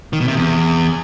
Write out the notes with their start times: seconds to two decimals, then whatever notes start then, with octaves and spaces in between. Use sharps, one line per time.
0.13 D#3
0.20 B2
0.28 C3
0.35 E2